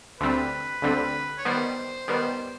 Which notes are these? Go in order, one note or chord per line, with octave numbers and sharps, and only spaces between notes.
D2 D3 G3 C4 B4
D2 D3 G3 C4
C#5
D#3 G3 B3 C5
D#3 G3 B3